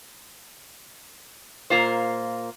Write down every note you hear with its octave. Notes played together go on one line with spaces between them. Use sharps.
A#2 A#3 F4 C5